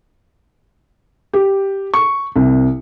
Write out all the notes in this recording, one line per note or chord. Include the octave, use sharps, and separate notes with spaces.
G4
C#6
C2